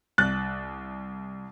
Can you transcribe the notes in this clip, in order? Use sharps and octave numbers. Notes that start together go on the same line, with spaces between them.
C2 F#6 A6